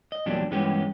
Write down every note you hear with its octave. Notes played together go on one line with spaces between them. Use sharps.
D#5
E2 A#2 F#3 G3 D4
G2 E3 G#3 B3 C#4 G4